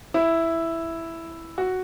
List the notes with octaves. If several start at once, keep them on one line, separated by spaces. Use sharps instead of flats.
E4
F#4